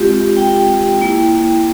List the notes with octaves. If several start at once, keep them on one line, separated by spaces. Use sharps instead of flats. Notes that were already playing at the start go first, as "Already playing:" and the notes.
Already playing: G#3 C4 F4 G4
G5
A#3 E4